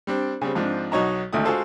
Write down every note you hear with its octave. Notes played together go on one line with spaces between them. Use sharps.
G3 C4 D4
C#3 G3 C4
G#2 F3 C4 D4
B1 D#4 F#4 C#5 D#5 A#5
G#1 D2 A3 E4 D#6
G#3 F4 F#4 G#4 A4 C5